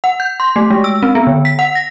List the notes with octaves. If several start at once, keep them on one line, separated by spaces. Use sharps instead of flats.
F#5
G6
C6
A3
G#3
E6
C4
B3
D3
B6
F#5
A#6